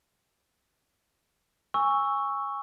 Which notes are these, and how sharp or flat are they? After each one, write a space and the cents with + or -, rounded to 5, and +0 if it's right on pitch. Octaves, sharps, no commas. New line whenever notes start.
G#5 -20 C#6 +0 E6 +0